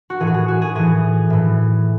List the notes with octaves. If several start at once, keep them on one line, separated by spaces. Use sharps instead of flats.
F#4
A2 E3 G#4
F#4
G#4
F#4
G#4
A2 E3 G#4
A2 E3